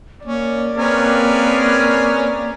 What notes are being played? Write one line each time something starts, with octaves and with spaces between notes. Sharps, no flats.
A#3 C#4 D5
C4 C#4 G#4 A#4 B4